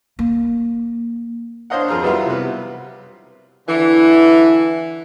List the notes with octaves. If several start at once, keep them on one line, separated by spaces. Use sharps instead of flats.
A#3
D4 C5 C#5 D#5 F5 F#5
F2 F4 G#4 A#4 A#5 F6
E3 F#3 G3 B3 E4 F4
C3 B4
D3 E3